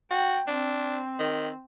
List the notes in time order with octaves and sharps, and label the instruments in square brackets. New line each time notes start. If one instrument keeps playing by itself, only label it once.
[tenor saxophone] F#4 [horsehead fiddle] G5
[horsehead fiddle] C4 [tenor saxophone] D4
[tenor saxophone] D#3